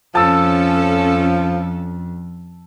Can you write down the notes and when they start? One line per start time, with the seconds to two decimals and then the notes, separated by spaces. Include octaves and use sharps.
0.15 F2 F3 C#4 A4 A5 E6